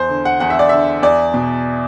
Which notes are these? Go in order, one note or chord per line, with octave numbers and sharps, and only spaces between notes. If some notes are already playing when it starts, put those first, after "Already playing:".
Already playing: E2 C5
D3
F#5
E2 F#5
E5
D5
D3 E5
E2 D5
B2